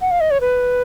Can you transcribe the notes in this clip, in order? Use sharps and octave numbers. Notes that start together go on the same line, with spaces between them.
F#5
F5
D#5
C#5
B4